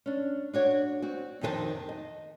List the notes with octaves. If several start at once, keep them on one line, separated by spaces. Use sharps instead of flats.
C#4 D4
D4 F#4 C#5
C4 F#4
F2 C3 D#3 G#4 C5 A5
D#5